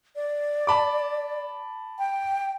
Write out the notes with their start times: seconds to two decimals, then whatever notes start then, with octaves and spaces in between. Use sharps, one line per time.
0.16 D5
0.67 A5 B5 D6
1.99 G5